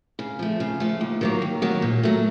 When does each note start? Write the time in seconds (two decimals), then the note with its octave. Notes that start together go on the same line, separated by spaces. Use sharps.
0.19 C#3
0.39 F3 A3
0.60 C#3
0.80 F3 A3
1.01 D#2
1.21 D#3 F#3 A#3
1.42 D#2
1.62 D#3 F#3 A#3
1.82 A#2
2.03 F#3 A3